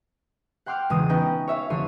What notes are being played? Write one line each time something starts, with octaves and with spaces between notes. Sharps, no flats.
F#5 G5 C6 D6 F6 G6
E1 C#3 D#6 D#7
B3 C#4 D#4 D#5 G5 A#5
C#5 E5 F5 F6
F1 D3 C#5 C6 D#7